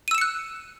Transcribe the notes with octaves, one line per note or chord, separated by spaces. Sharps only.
E6 F#6 C#7 D#7 E7